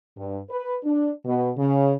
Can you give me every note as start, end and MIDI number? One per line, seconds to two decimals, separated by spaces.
0.17 0.38 43
0.50 0.76 71
0.84 1.11 62
1.25 1.50 47
1.57 1.92 49